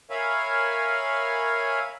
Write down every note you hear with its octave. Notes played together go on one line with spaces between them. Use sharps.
A#4 C#5 E5 F5 G#5 B5